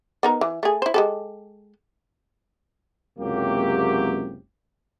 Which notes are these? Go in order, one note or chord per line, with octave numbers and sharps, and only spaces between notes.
B3 D#4 A#4
E3
A3 G#4
E4 C5
G#3 G4 A4
F#1 C#2 C3 F#3 A#3 G4